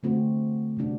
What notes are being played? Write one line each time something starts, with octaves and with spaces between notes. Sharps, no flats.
D3 A3 C4 F#4
C3 G3 D4 F#4